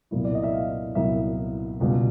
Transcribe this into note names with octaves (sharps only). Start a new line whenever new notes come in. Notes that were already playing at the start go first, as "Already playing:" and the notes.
C2 A#2 F#3 B3 E4
D5
D#5
E5
F5
C2 A#2 F#3 B3 E4 E5
C#2 B2 G3